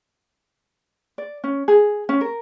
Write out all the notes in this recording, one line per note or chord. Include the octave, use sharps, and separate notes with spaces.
D5
C#4
G#4
C#4
A#4